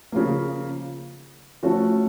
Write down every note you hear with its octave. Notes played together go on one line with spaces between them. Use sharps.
C#3 F3 A#3
F3 A3 C#4 F#4 A4